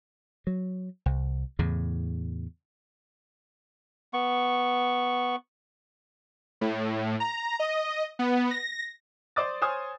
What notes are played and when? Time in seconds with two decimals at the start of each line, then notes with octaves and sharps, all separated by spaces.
0.47 F#3
1.06 C2
1.59 E2 A2 C#3
4.13 B3 C#6
6.61 A2
7.20 A#5
7.60 D#5
8.19 B3
8.51 A#6
9.36 C5 D5 D6 D#6 A6
9.62 C5 C#5 G#5 D#6 F6